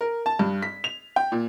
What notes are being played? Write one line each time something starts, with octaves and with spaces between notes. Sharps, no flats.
A#4
A5
G2
B6
F7
G5
A#2